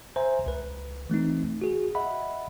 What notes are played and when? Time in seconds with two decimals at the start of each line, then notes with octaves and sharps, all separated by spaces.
0.16 C5 E5 G#5 A#5
0.46 C#2 B4
1.10 E3 A3 C4 D#4
1.61 F#4 G#4
1.95 D#5 E5 F#5 B5